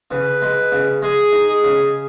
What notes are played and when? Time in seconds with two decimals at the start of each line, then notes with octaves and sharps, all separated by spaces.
0.11 C#3 B4
0.42 G#3
0.72 C#3
1.02 G#3 G#4
1.32 D#4
1.49 G#4
1.64 C#3